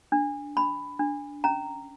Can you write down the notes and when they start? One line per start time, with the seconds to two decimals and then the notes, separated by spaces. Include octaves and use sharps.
0.12 D4
0.56 D4 B5
1.00 D4
1.44 C#4 A#5